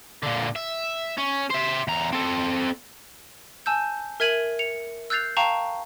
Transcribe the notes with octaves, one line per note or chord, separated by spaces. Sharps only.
A#2 D3
E5
C#4
C5 E5
E2 A#5
C4 A4
G#5 A5 E6 G6
A#4 E5 G#6 D#7 F#7
C#7 F7
E6 F#6 G6 A6 C7 F7
F5 G5 A5 A#5 C#6